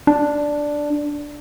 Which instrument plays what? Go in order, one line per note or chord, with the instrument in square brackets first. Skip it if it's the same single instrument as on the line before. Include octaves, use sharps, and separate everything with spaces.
[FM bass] D4